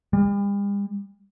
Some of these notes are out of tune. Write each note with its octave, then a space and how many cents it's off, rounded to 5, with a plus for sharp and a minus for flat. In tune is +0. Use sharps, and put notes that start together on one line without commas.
G3 +45